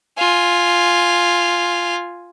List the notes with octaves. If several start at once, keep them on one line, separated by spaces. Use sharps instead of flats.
F4 G#5